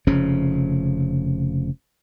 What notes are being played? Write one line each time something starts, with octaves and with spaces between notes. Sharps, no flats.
F1 C#3 F3 C#4